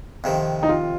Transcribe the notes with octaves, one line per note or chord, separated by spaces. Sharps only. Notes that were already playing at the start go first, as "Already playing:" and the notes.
F2 C3 D#3
D#4
F4